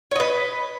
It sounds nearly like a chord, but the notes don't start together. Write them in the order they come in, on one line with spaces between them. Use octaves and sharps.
C#5 D#5 B4